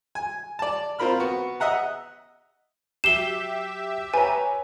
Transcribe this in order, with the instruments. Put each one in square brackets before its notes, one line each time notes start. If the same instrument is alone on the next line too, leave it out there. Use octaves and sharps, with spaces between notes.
[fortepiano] G#5
D5 A5
C4 F4 A#4 B5 F6
B3 F#4
D#5 E5 F#5 A#5
[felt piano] F#3 C7 [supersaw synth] G4 E5 [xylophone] E7 G7
[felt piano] B4 C#5 A#5 [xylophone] G#5